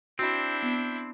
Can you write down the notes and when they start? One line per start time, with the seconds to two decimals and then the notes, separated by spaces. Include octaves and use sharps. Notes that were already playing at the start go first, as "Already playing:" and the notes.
0.19 C4 D4 E4 F#4
0.63 B3